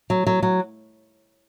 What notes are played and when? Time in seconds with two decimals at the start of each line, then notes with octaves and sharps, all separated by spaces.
0.10 F#3
0.27 F#3
0.43 F#3